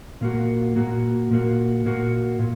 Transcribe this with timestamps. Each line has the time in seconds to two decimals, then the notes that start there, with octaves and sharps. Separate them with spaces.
0.21 A#2 A#3 F#4
0.76 A#2 A#3 F#4
1.31 A#2 A#3 F#4
1.86 A#2 A#3 F#4
2.39 A#2